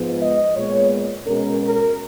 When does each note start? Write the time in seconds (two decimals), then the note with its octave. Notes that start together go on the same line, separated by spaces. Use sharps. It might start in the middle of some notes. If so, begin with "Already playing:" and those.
Already playing: G#2 F3 G#3 B3
0.20 D#5
0.55 A#2 G#3 B3 C#5
1.27 B2 G#3 C#4 A#4
1.62 A#4